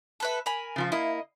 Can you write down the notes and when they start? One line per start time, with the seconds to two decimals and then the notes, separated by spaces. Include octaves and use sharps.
0.20 A4 B4 E5
0.46 A#4 G#5 B5
0.76 C#3 F3 F4
0.92 A#3 E4 D#5